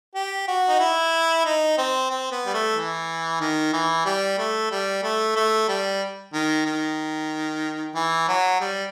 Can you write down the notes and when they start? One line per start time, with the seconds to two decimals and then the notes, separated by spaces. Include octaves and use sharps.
0.15 G4
0.48 F#4
0.69 D#4
0.79 E4
1.45 D#4
1.78 C4
2.10 C4
2.32 B3
2.46 G3
2.54 A3
2.76 E3
3.40 D#3
3.73 E3
4.05 G3
4.38 A3
4.71 G3
5.03 A3
5.36 A3
5.68 G3
6.33 D#3
6.65 D#3
7.96 E3
8.29 F#3
8.61 G3